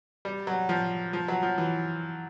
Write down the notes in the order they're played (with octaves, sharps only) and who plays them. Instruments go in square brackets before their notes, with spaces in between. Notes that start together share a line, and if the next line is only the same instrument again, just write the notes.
[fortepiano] G3
F#3
F3
F3
F#3
F3
E3